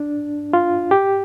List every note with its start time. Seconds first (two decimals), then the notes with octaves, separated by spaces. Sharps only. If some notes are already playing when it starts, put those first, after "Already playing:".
Already playing: D4
0.53 F4
0.91 G4